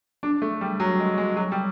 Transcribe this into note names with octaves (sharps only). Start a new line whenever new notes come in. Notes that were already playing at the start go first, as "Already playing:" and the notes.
D4
A3
G3
F#3
G#3
G#3
F#3
G3